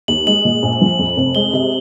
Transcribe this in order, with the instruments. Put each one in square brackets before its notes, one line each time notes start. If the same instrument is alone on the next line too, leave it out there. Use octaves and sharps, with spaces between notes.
[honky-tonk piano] D#2 [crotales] F#7
[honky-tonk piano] G#3 [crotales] F#7
[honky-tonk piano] A#2
A#1
F3
F2
F1
[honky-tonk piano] G#3 [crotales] G7
[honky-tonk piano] C3